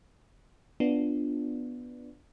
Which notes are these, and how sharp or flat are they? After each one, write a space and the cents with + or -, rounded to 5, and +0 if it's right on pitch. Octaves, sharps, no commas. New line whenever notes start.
B3 +0 D4 +0 F4 +0